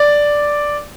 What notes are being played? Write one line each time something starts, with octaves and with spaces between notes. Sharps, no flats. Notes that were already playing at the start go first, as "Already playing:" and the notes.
Already playing: D5